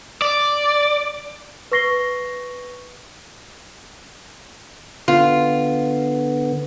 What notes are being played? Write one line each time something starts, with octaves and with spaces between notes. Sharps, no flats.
D5
B4 C#6 A#6 C7 G7
D3 B3 F4